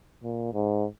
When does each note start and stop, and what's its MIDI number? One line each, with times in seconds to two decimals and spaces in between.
0.23 0.50 46
0.53 0.85 44